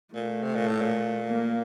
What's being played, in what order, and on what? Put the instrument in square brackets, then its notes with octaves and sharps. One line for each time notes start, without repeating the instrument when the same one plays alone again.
[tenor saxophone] A#2 [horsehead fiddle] A3
[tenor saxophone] C3
A#2
A2
A#2
[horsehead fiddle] A#3